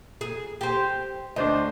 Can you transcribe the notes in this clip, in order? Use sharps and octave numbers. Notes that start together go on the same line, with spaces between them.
G#4
G4 C5
D2 D4 C5 D#5